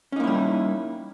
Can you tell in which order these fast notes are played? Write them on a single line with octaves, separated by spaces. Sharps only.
C#4 D#4 A#3 E4 G3